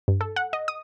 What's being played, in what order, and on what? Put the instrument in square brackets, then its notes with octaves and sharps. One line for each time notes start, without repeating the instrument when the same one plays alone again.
[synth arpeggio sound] G2
A4
F#5
D#5
D#6